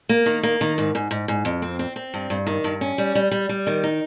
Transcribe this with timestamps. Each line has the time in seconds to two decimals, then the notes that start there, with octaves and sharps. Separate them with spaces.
0.09 A#3
0.26 D#3
0.43 A#3
0.61 D#3
0.78 G#2
0.95 G#2
1.11 G#2
1.28 G#2
1.45 F2
1.62 C4
1.79 C4
1.96 C4
2.14 G2
2.30 G2
2.47 D#3
2.64 G2
2.81 C#4
2.98 G3
3.15 G3
3.32 G3
3.49 G3
3.67 D#3
3.84 D#4